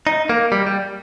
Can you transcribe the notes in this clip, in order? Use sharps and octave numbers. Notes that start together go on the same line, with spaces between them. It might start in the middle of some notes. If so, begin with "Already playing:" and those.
D#4
A#3
G3
G3